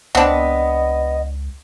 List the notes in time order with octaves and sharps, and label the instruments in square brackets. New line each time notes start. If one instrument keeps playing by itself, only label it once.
[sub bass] C#2 [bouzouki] B3 [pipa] C4 D4 [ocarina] D#5